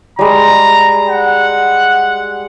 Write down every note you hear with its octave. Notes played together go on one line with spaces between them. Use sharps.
G3 G#3 A#5
F#5